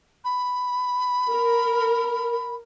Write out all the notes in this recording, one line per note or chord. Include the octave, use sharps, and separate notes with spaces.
B5
A#4